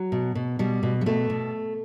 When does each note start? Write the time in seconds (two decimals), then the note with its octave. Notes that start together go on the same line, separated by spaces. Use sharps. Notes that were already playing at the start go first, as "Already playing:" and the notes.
Already playing: F#3
0.12 B2
0.35 B2
0.59 B2 G3
0.83 B2
1.01 G3
1.06 B2 A3
1.30 B2